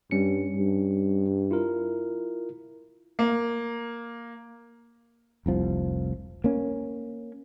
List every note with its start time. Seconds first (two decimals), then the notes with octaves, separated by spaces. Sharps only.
0.11 G2 G3 C#4 C#7
0.56 G2
1.51 E4 F4 A#4
3.19 A#3
5.46 F1 C2 F3
6.44 A#3 C#4